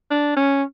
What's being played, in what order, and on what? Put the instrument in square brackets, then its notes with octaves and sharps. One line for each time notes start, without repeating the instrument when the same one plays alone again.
[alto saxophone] D4
C#4